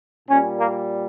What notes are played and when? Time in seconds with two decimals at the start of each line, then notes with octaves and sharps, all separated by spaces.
0.28 A#2 G3 C#4
0.58 A#3